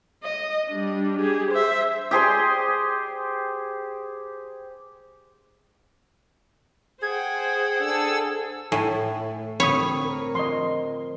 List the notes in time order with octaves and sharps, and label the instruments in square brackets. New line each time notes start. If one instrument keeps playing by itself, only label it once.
[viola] D#5
G3 D4
G4 G#4
C5 E5
[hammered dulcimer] G4 G#4 C5 C6
[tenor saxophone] G#4 [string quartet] C5 F#5 G5 [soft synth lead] G#6
[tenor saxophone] D4 [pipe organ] G#4 A4 E6
[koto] A2 [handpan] A4 [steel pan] G#5
[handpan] D3 F3 C4 [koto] C#5 [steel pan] B5 C#6 D#6
[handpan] A#4
[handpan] F3 [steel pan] D#5 C6